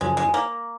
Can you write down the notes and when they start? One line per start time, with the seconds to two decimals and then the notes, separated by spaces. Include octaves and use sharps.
0.01 F#2 C#3 F3 G#3
0.17 G#3
0.34 A#3